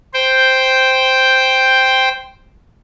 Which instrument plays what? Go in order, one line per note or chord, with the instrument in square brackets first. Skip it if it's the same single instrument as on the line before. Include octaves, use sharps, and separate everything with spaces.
[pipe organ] C5 G5